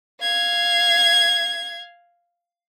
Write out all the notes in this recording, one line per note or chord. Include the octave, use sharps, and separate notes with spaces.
F5 G#6